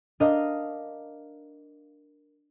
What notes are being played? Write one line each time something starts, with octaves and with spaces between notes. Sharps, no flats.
D4 A#4 D#5 F5